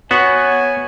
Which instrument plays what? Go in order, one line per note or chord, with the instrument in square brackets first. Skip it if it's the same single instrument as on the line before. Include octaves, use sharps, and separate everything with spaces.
[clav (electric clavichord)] B3 [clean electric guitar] F#4 [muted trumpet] C#5 [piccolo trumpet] G#5